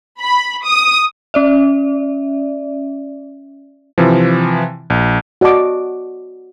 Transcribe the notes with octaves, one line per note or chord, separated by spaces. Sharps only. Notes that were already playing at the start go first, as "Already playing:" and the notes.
B5
D#6
C#4 D5 E5
C3 E3 F3
A#1
F#4 D5 D#5 A5 D6